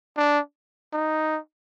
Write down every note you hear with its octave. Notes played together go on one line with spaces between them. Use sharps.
D4
D#4